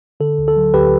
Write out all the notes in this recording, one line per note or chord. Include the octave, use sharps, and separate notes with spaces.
D3 A4
D2
A4
F#3
D2 G4 B4